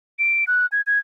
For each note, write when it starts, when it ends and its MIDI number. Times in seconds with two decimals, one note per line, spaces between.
0.19 0.44 98
0.47 0.66 90
0.72 0.81 92
0.87 0.99 92